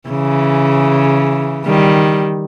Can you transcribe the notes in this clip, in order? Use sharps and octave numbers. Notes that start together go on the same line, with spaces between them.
C#3 E3
D#3 G3